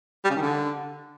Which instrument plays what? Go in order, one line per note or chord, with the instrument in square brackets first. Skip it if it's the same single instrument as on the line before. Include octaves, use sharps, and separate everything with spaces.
[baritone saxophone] G3
C#3
D#3
D3